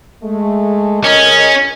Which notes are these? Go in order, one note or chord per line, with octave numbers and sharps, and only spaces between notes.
G#3 A3
C#2 C#4 A#4 D#5